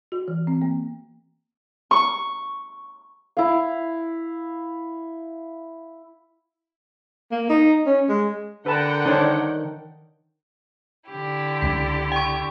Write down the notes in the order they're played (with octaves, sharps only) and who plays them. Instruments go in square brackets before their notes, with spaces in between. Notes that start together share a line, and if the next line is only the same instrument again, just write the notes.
[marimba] F#4
E3
C4
A#3
[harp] C#6
[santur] E4 F5
[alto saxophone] A#3
D#4
C#4
G#3
[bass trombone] D3 [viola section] A#4 F#5 G5 [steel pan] B4 A5 A#5
[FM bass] D#3 [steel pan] D4 C5 C#5
[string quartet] D3 E4 G4
[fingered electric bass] C#2 F3 D4 [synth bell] B6
[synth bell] G5 C#6